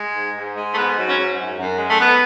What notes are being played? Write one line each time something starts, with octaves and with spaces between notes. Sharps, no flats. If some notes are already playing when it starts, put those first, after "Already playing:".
Already playing: G#3
G#2
G#2
G#3
A3
G#2 B3
F#3
C#4
G#2
F#2
F#2
G#3
A3
G#2 B3